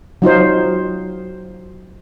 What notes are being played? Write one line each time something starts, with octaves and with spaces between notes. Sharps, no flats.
F#3 D#4 F4 C5